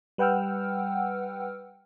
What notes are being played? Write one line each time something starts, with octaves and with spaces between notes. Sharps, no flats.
G3 B4 F#5 G5 E6 F6